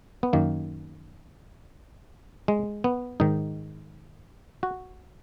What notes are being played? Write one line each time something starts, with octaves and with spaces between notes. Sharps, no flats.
B3
F#2 D#3 A#3
G#3
B3
G#2 D#3 D#4
F#4